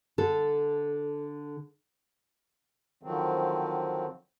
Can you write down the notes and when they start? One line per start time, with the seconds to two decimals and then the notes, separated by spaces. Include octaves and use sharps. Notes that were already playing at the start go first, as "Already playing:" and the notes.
0.18 D3 A4
3.03 D3 D#3 F3 F#3 C4